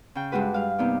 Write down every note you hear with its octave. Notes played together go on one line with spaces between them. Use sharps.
C#3 G5
G2 G3 G#3 F#4 B4
G3 F5
C3 A#3 B3 D#4 D5